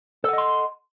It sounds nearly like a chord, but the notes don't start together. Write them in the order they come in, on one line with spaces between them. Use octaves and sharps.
A4 F#5 D#5 C6